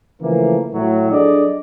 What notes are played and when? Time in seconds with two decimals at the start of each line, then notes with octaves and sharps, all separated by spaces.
0.21 C#3 E3 F3 A3 A#3
0.73 A2 F#3
1.12 F#3 D4 G#4 A4 D5 D#5